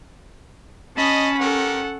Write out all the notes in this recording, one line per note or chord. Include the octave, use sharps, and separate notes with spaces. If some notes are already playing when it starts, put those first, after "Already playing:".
C#4 D#5 A5 B5
G4 A4 A#4 F#5